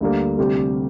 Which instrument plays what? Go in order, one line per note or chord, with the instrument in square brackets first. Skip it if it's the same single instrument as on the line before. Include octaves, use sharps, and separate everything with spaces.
[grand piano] D2 D3 G3 A#3
D2 C3 G3 C4 G4